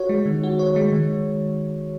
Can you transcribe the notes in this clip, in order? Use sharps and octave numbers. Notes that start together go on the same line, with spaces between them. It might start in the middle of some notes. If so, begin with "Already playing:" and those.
Already playing: F#4 C#5
G#3
D#3
F#4
C#5
G#3
D#3